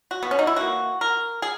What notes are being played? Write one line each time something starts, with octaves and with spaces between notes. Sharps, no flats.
F#4
B3
C#4
D#4
E4
E3 A#3 F#4
A#4
G#4